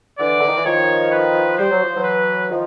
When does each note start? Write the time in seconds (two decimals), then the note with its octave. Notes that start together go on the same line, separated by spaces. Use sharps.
0.19 D3 E3 D5
0.41 D3
0.48 D#3
0.57 E3
0.65 D#3 F3 C#5
1.12 B4
1.58 G3 C5
1.71 F#3
1.83 F3
1.95 E3 F#3
2.04 B4
2.51 D#3 F3